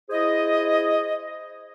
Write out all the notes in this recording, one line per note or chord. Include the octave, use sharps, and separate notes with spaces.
E4 G#4 C5 D#5